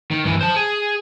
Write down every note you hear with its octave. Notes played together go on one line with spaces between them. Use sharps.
D#3
G2 E3
C5 A5
G#4